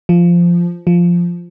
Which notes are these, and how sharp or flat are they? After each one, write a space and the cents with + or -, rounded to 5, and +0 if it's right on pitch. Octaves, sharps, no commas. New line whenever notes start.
F3 -10
F3 -5